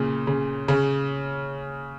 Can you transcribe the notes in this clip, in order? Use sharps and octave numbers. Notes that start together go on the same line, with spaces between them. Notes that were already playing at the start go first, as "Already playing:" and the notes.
Already playing: A#2 C#3
C#3
C#3